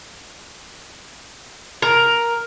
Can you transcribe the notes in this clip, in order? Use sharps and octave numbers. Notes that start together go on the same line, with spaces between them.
A#4